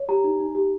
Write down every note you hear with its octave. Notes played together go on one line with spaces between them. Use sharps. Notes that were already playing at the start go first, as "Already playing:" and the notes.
Already playing: C#5
G4 A#5
D#4
D#4
G4